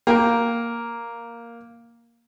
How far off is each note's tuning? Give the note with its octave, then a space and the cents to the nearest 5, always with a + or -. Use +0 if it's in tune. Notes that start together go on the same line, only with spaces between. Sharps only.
A#3 +0 G5 +0